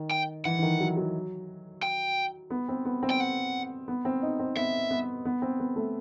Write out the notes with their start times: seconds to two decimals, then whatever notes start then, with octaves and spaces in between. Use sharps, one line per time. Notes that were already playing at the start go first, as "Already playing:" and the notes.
Already playing: D#3
0.11 G5
0.45 E3 F#5
0.59 E3
0.62 D#3
0.80 F#3
0.97 F#3
1.83 G5
2.50 B3
2.68 C4
2.85 B3
3.03 C4
3.10 G5
3.20 F#5
3.88 B3
4.05 C4
4.22 D#4
4.39 C4
4.56 B3 E5
4.91 B3
5.25 B3
5.42 C4
5.60 B3
5.76 A3